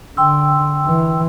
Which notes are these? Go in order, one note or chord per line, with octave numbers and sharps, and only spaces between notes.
D3 G5 C6 E6
E3